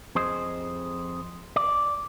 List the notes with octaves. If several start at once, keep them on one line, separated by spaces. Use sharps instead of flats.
F2 G#4 C5 D#5
D5